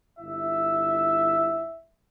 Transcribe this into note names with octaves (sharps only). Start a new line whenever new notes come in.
G1 E4 E5